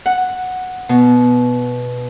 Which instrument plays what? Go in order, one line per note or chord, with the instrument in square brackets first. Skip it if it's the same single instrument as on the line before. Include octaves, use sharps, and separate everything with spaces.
[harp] F#5
B2